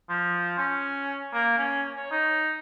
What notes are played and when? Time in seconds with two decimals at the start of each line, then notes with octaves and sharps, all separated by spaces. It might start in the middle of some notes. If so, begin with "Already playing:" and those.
0.09 F3
0.58 C#4
1.33 A#3
1.58 C#4
1.95 C#5
2.11 D#4